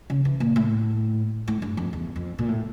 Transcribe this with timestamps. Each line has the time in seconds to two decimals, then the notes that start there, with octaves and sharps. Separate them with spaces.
0.10 C#3
0.25 E3
0.40 A#2
0.56 A2
1.48 A2
1.62 G2
1.77 F2
1.93 E2
2.16 F2
2.39 A#2
2.48 A2